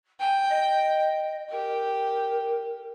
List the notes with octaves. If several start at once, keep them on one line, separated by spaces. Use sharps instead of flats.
G5 G#5
D#5
G4 A#4